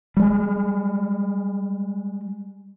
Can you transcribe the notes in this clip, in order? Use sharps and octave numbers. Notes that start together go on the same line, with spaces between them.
G3 G#3